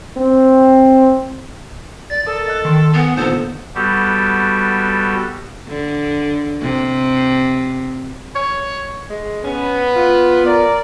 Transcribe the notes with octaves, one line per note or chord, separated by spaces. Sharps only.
C4
D5 A6
A4 A#4 D5 D#6
D#5 F#6
D#3 C6
B3 F#5 G#5
A#1 D3 D#3 B3 A4 C5
G3 B3 F#4 G4 A4
D3
C3
C#5
G#3
B3 C#4
F4
A#4 D5